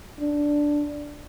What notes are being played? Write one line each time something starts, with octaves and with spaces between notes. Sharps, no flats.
D4